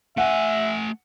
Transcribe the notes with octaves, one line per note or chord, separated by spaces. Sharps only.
A3 E5 F#5 G#5